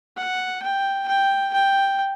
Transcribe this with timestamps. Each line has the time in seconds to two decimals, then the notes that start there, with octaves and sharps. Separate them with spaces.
0.17 F#5
0.62 G5
1.07 G5
1.52 G5